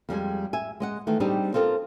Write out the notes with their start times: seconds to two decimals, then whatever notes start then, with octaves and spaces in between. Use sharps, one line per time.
0.09 F2 G3 G#3 G#5
0.53 E5 G#5
0.80 G#3 D#5 F#5
1.07 D#3 E3 A3
1.20 G3 C4 D4 D#4 G4 G#4
1.54 C4 F4 A4 A#4 D#5